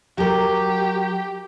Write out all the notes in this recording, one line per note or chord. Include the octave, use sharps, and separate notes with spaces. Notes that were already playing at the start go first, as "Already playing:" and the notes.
F#3 G4 A#4